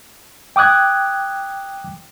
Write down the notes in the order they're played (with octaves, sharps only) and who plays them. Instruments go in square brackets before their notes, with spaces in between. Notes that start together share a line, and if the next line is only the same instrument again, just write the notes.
[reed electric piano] G5 D6 D#6 F#6 G#6